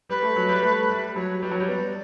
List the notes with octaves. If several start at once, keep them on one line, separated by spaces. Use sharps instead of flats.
G3 B4
A3
F#3
G3
A3
G3
F#3 C#5
G3 B4
F#3
G3 C#5
B3 D5